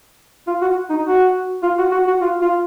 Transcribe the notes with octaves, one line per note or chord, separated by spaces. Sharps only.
F4
F#4
D#4
F#4
F4
F#4
F#4
F#4
F4
F4